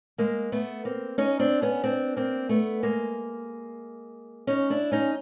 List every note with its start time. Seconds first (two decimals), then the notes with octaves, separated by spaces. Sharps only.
0.18 G#3 A#3
0.52 A3 B3
0.85 A#3 C4
1.18 C#4 D#4
1.39 C4 D4
1.62 B3 C#4
1.84 C4 D4
2.16 A#3 C4
2.49 A3 B3
2.83 G#3 A#3
4.47 C#4 D#4
4.70 D4 E4
4.92 C#4 D#4